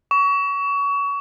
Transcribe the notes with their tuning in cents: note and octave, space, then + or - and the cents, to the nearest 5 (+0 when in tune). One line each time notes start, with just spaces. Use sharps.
C#6 +30